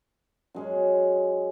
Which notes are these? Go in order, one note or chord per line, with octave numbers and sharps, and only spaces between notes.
F#2 G#3 C#4